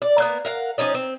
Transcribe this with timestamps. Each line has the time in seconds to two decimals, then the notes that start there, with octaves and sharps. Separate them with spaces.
0.02 D5
0.18 A#3 B3
0.45 A#4 F5 F#5
0.78 F3 C#4 D#4 D5
0.94 C4